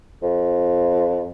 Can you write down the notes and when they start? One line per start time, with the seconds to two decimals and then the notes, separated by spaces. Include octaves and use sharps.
0.23 F2